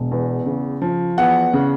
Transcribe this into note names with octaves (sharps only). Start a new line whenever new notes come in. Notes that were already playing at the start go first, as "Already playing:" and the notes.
Already playing: E1
E2
C#3
F3
E2 F#5
C#3